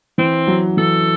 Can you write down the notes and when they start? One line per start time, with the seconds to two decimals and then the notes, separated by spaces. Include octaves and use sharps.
0.18 E3 C4
0.48 F#3
0.77 E3 A4